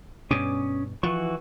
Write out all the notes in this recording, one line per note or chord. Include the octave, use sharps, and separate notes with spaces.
G2 B2 C#4 D6 D#6
E3 F3 F#4 C#6